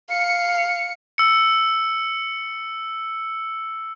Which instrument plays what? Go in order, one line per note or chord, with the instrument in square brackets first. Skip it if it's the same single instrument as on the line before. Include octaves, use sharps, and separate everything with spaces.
[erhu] F5 [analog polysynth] C#7
[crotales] E6 C#7